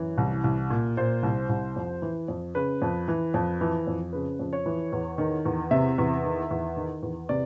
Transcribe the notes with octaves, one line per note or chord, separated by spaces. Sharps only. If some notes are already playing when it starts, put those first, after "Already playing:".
Already playing: F#2 E3
C2
C2
A#2
A#2 C5
C2
C2
F2
E3
F2
C#3 B4
F2
E3
F2
E3
F2
C#3 B4
F2
C#5
E3
E2
D#3
E2
C3 E5
E2
D#3
E2
D#3
E2
C3 D5